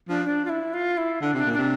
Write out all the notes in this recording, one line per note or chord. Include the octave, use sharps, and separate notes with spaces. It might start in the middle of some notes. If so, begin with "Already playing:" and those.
F3 D4
D4
F4
E4
F4
E4
D3 D4
C3 D4
A#2
C3 D4